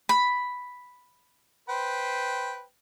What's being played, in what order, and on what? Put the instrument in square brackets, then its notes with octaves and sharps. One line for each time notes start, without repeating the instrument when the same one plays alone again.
[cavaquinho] B5
[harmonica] B4 C5 G5